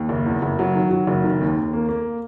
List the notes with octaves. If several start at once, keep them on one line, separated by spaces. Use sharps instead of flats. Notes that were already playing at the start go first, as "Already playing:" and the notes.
Already playing: D#2
F#1
E2
F#1
F#3
D#3
F#3
F#1
D#3
D#2
D#2
A#3
A#3